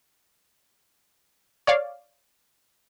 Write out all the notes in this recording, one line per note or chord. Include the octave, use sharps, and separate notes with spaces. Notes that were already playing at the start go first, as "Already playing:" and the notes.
C#5 D5 F5